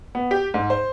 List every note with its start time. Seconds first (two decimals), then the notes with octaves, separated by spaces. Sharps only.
0.15 B3
0.31 G4
0.54 G#2
0.70 C5